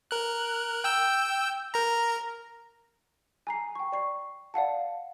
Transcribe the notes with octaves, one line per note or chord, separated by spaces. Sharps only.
A#4 F#6
G5 E6 G6
A#4 A#5
G#5 A#5 C7
G5 C#6
D5 C#6 C7
D5 F5 F#5 A5